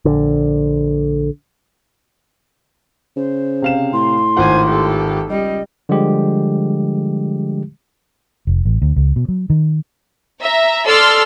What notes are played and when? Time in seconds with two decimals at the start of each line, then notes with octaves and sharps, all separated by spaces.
0.05 A#1 D3
3.17 C#3 C5
3.62 C3 F5 E7
3.93 A2 C6
4.37 G#1 F4 C5 F#5 G#5
4.66 G4 A4
5.30 C#2 G3 D#5
5.89 D3 F3 G3 G#3 G4
8.47 F1
8.65 A1
8.82 D2
8.96 C#2
9.16 B2
9.28 F#3
9.50 D#3
10.41 E5 A#5
10.87 A4 D5 C6 E6 F6